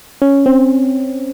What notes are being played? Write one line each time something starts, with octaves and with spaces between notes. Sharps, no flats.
C#4
C4